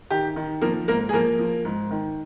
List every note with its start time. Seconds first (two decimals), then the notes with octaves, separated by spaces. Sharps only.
0.11 D#3 G4
0.36 D#3
0.62 F3 A#3 A#4
0.88 G#2 A#3 A#4
1.09 G#4
1.13 F3 A#3 A#4
1.39 F3
1.65 G#2
1.91 D#3